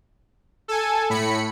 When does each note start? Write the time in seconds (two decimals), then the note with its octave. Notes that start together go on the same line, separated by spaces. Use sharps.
0.68 A4 G#5
1.10 A2 B5 C#7